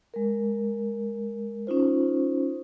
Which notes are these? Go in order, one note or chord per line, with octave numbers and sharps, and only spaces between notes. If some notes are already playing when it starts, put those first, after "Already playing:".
G#3 A#4
C#4 D#4 F4 C5